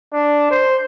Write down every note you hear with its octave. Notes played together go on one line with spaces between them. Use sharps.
D4
C5